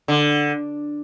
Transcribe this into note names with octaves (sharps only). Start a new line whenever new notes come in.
D3